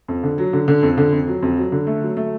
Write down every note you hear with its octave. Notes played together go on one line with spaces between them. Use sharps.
F2
D3
F#3
D3
D3
F2
D3
F2
F#3
F2
F#3
D3
A3
F#3
A3